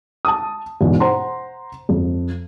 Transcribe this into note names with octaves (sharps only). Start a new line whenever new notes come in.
A5 D#6
E2 G#2 B2
C5 F#5 A#5 C6
F2